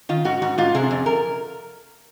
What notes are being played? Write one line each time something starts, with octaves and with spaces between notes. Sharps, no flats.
D#3 F4
G#2 F#4
G#2 F#4
G#2 F4
C3 G#4
F2
A#4